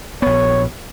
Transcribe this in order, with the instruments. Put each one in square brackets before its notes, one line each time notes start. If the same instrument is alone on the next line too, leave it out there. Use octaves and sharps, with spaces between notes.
[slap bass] A#1 B3 [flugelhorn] C#5